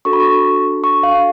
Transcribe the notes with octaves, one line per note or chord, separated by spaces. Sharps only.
D4 F#4 A4 C#6
B5
C#6
C#6
F5